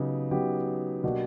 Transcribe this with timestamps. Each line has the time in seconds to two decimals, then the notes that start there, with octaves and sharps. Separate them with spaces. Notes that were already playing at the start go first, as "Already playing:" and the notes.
Already playing: C#3 F#3 B3 D#4 G4
0.31 C#3 F#3 B3 D#4 G4
1.04 B2 F#3 A#3 D4 G4